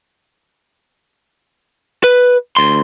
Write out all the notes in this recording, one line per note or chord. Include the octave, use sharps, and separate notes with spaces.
B4
D2 C6